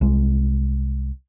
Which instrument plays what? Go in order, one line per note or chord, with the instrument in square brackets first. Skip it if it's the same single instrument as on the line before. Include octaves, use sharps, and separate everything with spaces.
[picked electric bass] C2 G#3